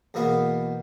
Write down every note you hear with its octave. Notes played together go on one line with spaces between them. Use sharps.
E2 B2 A#3 B3